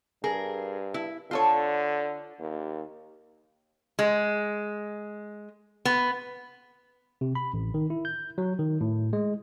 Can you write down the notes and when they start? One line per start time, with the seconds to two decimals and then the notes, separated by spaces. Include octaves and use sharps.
0.24 G2 G#4 A#4
0.94 E4
1.31 D3 F4 A4 C#5
2.40 D#2
3.99 G#3
5.85 B3
7.21 C3
7.35 B5
7.54 A1
7.74 D#3
7.90 E4
8.05 G6
8.38 F#3
8.59 D#3
8.81 A2
9.13 G#3